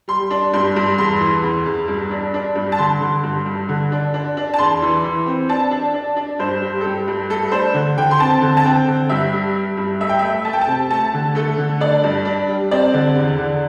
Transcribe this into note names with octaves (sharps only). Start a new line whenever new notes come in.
G3 C6
D4
G2 C6
G2
E2 C6
E3
E2
E2
G2
D4
D4
G2
A5
D3 C6
D3
G2
G2
D3
D4
D4
D4
A5
E2 C6
E3
E3
C4
D4 A5
D4
D4
D4
G2 C5
G3
A4
G2 G4
G2
A3 A4
D4 C5
D3
D3 G5
C6
C4 A5
D3
A5
C4 G5
D3
G2 E5
G3
G3
G2
A3 E5
G5
A3 E5
A3 A5
G5
A5
C3
A3 A5
D3
A3 A4
D3
D4 D5
G2
D4
G3
C4 D5
D3
E2
D3